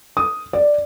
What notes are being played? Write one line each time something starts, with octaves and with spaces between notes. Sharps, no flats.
D#6
D5